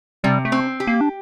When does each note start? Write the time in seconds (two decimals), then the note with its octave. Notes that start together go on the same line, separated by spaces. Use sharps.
0.24 C3 G3
0.45 A3
0.52 C4
0.80 G4
0.87 A#3
1.01 D4